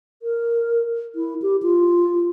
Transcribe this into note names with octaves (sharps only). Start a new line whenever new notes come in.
A#4
E4
G4
F4